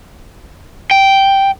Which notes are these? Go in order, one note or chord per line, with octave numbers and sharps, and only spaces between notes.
G5